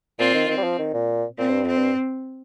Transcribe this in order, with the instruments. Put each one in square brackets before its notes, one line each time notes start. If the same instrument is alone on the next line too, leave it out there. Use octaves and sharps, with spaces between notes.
[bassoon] A#2 [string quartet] C4 F4
[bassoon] D#3
[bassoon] D#3 [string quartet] C4
[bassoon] G3
F3
D#3
A#2
[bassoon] A#2 [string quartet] C4
[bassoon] G2
[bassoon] F2 [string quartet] C4
[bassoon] G2